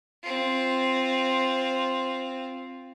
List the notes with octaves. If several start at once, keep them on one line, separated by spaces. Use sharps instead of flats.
C4 F4